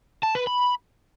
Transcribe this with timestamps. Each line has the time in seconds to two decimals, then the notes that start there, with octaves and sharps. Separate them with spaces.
0.23 A5
0.35 B4
0.47 B5